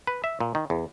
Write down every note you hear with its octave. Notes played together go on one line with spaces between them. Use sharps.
B4
E5
A#2
D#3
E2